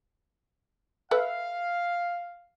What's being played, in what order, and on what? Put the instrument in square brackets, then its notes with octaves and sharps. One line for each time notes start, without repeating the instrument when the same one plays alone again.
[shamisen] A4 B4 E5 [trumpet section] F5